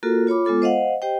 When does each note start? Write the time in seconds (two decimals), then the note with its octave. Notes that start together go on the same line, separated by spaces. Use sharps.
0.03 A#3 F4 F#4 A4 A#4
0.27 F4 C#5 B5 D6
0.45 G#3 B3 F4 A4 D6
0.62 C5 D#5 F5 F#5
1.02 G4 C5 D#5 G5